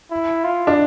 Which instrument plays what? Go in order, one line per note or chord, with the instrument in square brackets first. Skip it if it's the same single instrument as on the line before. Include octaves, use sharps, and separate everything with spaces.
[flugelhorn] E4
F4
[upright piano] D4